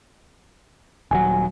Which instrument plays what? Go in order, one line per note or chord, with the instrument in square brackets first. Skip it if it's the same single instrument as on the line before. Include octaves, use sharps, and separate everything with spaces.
[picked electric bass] D#1 F#3 [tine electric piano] G#5